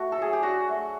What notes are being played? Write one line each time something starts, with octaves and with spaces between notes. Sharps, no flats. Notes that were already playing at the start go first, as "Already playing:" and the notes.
Already playing: A3 F#4
A4
F#3 G#4
G4
D4 F#4
A3